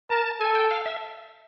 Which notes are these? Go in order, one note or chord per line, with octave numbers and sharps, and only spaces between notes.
A#4 A5
A4 G#5
G5
F5
E5